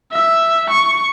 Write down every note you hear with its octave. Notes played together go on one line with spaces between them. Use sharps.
E5
C#6